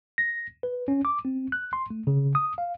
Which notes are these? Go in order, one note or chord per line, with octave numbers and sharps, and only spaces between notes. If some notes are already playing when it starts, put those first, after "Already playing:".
A#6
B4
C#4
D6
C4
F#6
C6
A3
C#3
D#6
F5